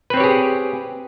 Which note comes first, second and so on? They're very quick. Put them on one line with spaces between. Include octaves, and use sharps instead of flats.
B4 C4 C#5 G4 G#4